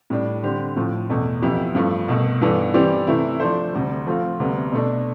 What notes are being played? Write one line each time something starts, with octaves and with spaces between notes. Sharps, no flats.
A2 G3 D4
D3 G3 C4 G4
A2 F3 A3
E2 B2 A3
F2 E3 B3 E4 G4
G2 F3 A3
C2 B2 A3
G2 E3 B3 D4 A4
E3 G3 C4 G4 D5
C3 E3 A3 E4
F3 A3 D4 A4 C5
D2 C3 G3
F3 A3 C4 F4
D2 C3 G3 B3
B2 A3 D4